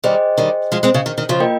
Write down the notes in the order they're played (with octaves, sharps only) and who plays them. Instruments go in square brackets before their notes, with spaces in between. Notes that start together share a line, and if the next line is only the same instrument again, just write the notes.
[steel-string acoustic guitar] D#3 G3 [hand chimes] G#4 C5 D#5 G5
[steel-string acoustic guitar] D#3 G3
F3 G#3
G#3 C4
C#3
D#3
D#3
C#3 F3
[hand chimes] A#3 F4 A#4 D#5 G5